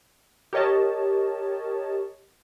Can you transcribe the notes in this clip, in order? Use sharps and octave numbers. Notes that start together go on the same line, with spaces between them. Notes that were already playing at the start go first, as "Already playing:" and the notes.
G4 A#4 C#5 D#5 A5